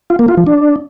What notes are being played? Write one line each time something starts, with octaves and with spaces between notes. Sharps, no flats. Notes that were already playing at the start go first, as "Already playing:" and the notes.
F4
A#3
F4
F3
D4